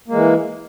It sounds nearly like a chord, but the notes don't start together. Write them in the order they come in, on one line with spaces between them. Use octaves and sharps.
A#3 G#3 E3